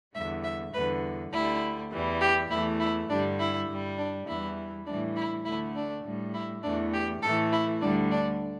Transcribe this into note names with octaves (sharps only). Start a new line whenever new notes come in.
E2 D3 G3 E5
E5
E2 D3 G3 B4
D2 D3 G3 E4
E2 E3 G3
G4
E2 E3 A3 E4
E4
G2 D3 G3 D4
E4
G2 G3
D4
E2 E3 G3 E4
A2 E3 G3 D4
E4
D2 D3 A3 E4
D4
A2 G3
E4
E2 E3 A3 D4
G4
A2 E3 A3 A4
E4
D2 D3 G3 D4
D4